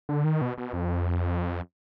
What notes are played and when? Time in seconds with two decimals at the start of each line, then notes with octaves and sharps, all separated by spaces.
0.09 D3
0.24 D#3
0.41 B2
0.58 B2
0.73 F2